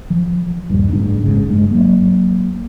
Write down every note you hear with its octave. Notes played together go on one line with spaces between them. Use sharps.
F3
D#1 G2
F#1 G#2 D4
A1 G#2 C#3
G2 G#3
F#3 A#3